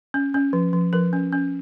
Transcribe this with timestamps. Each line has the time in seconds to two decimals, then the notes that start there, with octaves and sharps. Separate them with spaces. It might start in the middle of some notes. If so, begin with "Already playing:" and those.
0.14 C#4
0.34 C#4
0.53 F3
0.73 F3
0.93 F3 A#4
1.13 C#4
1.32 C#4